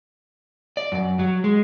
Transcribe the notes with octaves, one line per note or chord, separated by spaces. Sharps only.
D5
F#2
F#3
G#3